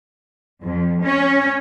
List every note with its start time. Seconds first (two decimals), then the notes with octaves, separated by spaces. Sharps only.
0.64 F2
1.04 C#4